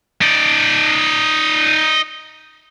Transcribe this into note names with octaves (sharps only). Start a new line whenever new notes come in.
D#4 D5